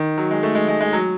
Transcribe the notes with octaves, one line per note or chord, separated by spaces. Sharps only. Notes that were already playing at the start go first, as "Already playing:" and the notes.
Already playing: D#3
F#3
G#3
A3
G#3
G#3
G#3
F#3